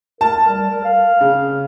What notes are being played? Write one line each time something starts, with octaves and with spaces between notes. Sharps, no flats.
A#4 A5
G3
A#4
F5
C#3